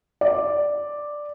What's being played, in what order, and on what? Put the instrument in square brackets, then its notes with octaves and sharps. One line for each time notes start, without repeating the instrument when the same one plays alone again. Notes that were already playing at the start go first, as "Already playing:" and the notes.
[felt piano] D5